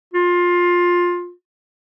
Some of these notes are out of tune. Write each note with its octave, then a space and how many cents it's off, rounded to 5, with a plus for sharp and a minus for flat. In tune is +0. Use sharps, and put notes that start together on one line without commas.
F4 +15